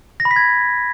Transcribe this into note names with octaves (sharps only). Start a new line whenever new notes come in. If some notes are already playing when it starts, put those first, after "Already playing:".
A#6
B5
B6
G#6